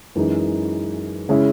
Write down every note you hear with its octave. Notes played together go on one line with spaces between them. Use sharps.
F#2 E3 G#3 D#4
C#3 G#3 C#4 E4